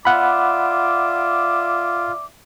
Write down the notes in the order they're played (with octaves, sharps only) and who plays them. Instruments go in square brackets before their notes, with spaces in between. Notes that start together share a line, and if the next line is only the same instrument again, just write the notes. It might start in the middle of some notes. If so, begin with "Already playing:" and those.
[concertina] F4 [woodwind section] D5 E5 D6 [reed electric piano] F#5 B5